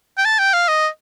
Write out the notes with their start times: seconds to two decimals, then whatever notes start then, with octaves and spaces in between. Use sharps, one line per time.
0.18 G5
0.25 A5
0.39 G5
0.53 F5
0.68 D#5